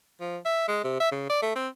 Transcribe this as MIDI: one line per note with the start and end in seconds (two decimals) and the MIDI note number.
0.21 0.37 53
0.45 0.66 76
0.68 0.81 56
0.84 0.96 48
1.00 1.11 76
1.12 1.28 49
1.29 1.41 74
1.42 1.54 57
1.55 1.68 60